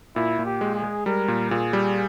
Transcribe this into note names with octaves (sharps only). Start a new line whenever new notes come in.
A#2 E4
A#2
G4
G#3
G#4
G#3
G3 A#4
A#2
A#2 G#4
G3